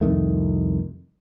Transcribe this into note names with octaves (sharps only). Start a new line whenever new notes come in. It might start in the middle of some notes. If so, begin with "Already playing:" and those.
C2 F2 D#3 A3